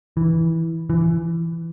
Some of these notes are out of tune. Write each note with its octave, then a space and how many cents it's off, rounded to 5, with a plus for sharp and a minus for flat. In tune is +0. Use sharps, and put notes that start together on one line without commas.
E3 -10
E3 +20